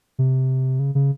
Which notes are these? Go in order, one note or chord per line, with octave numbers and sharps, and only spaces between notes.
C3
C#3
C#3